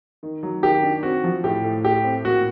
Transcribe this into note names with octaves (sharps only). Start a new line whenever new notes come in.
D#3
F#3
D#3 G4
D4
C4 F#4
F3
A2 G4
A2
A3 G4
C4
A#2 F#4